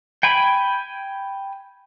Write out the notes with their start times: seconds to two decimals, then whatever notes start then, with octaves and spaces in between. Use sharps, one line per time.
0.23 G5 G#5 B5